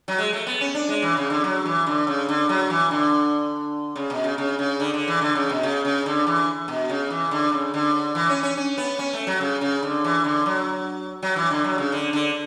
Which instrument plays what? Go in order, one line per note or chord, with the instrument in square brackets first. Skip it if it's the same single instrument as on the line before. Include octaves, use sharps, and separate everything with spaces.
[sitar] F#3
G#3
A3
B3
C#4
D4
G#3
E3
C#3
D3
F#3
E3
D3
C#3
D3
F#3
E3
D3
C#3
B2
C#3
C#3
C#3
D3
D3
E3
D3
C#3
B2
C#3
C#3
D3
E3
B2
C#3
E3
D3
C#3
D3
E3
C#4
C#4
C#4
B3
C#4
A3
F#3
C#3
C#3
D3
E3
D3
F#3
F#3
E3
D3
F#3
C#3
D3
D3